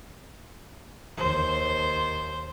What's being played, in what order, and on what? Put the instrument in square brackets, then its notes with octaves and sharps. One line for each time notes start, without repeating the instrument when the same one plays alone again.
[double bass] D#2 [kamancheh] C5